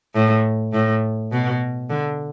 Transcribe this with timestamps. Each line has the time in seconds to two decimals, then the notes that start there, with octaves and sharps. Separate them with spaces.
0.15 A2
0.73 A2
1.32 B2
1.90 D3